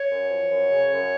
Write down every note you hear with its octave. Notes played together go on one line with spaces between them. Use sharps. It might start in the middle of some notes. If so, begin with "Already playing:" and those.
Already playing: C#5
F#2
F3
F#2
C#3
F#2